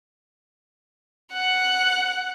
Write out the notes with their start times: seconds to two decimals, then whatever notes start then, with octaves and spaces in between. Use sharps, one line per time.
1.33 F#5 F#6